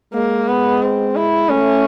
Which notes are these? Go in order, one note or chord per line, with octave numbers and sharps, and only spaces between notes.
G#3 A#3
B3
C4
E4
A3 C#4